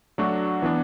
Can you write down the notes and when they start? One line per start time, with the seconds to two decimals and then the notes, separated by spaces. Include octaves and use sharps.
0.18 F#3 A3 D4 F#4
0.62 E3 B3 D4